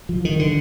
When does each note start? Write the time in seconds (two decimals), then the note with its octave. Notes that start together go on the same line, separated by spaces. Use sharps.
0.09 F3
0.25 D#3
0.39 D3